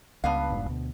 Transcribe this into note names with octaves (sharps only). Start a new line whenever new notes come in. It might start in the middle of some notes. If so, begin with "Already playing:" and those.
C#2 G2 B3 F5
F1 G#2
D2 B2